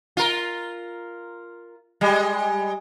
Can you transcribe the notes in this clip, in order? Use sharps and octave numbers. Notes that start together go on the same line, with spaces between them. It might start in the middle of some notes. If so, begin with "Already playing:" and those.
F4 A#4
G3 G#3